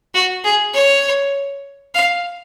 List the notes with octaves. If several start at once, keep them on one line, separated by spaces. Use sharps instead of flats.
F#4
G#4
C#5
F5